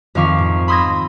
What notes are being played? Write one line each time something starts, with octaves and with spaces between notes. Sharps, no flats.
F2 D#3 F5 C#6 D6 B6
G#2
B5 C6 D#6 E6 G#6 A#6